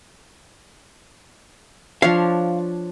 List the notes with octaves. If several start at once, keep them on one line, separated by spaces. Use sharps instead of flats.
F3 D4 C#5 F5